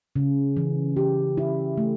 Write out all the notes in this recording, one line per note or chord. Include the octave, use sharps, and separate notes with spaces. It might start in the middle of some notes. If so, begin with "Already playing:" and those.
C#3
E3
G4
E4
A3